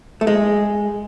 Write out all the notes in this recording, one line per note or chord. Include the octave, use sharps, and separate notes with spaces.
A3
G#3